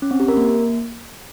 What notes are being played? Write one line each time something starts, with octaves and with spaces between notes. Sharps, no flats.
C#4
C4
G4
A#4
A#3